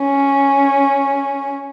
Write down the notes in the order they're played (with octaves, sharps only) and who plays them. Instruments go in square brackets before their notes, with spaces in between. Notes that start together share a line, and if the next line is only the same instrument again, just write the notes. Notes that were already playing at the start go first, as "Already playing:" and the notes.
Already playing: [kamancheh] C#4